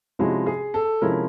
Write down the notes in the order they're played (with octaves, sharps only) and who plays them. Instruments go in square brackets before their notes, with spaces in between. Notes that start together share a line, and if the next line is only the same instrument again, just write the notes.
[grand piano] C3 F3 G#3 C#4 E4 [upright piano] F#4
[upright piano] G#4
A4
[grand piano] C3 F3 G#3 C#4 E4 [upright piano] A#4